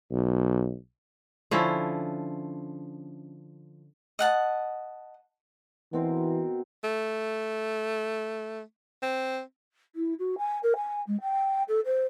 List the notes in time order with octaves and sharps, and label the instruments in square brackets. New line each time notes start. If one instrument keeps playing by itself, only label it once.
[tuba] B1
[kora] D3 F3 C#4 E4
[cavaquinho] D#5 F#5 A5
[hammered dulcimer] B2 C4 A#4 [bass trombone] E3
[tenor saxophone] A3
C4
[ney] E4
F#4
G#5
A#4
G#5
G#3
G5
A4
C5